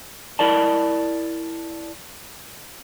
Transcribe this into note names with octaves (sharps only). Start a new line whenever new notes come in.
E4 A#4 D5 A5